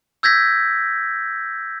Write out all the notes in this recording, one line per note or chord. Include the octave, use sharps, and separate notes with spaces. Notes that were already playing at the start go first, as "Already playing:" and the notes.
E6 G6 G#6 A#6 B6